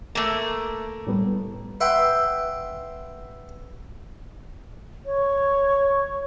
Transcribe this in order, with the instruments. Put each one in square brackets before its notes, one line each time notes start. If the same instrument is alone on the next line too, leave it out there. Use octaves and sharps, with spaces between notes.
[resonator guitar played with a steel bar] A3 A#3
[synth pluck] A2 G3 B3
[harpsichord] B4 E5 F#5 G5 B5 C6
[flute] C#5